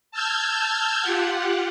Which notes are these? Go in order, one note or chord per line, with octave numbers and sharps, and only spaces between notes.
A5 E6 F6 G6 G#6
F4 G4 F#5